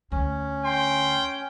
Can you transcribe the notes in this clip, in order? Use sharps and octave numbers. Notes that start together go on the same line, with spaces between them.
D2 C#4
G5 C6